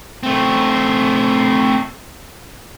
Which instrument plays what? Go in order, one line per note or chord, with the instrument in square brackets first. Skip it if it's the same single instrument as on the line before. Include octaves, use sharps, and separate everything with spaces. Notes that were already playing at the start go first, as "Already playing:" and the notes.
[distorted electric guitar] A3 C4